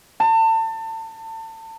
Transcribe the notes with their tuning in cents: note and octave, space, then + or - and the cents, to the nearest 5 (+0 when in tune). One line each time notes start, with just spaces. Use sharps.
A5 +30